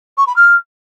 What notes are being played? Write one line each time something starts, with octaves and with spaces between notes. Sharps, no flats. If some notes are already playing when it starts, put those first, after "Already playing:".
C#6
B5
F6